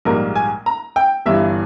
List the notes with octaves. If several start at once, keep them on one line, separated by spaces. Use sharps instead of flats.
A#1 G#2 G3 A#3 A#4
G#5
A#5
G5
G1 G2 E3 E5